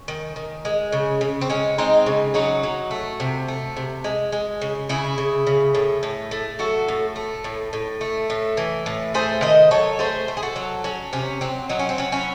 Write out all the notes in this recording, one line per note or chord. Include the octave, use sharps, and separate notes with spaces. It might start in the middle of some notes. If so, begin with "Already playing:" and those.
Already playing: C#4
D#3
D#3
G#3
C#3
C#3
C4
G#3 C#4
G#3 C4 D#4
C#3
F#3 D#4 F#4
F#3
A3
C3
A3
C3
G#3
G#3
C#3
C#3 E4 G#4
C#3
C#3
A2
A2
A3
F#3 F#4 A4
A2
A3
A2
A2
A3
A2
E3
A2
A3 G#4 C5
D#3 C5 D#5
F#3 A4 C#5
A3 G#4 C5
A3
G#4
F#4 A4
F#3
F#3 C#4
C3 C#4
F#3 C4
F#3 D#4
C#4
C4
F#3 C#4
C#4 E4